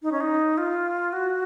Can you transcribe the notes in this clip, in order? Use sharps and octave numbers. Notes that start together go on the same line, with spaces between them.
D#4
C#4
D#4
F4
F#4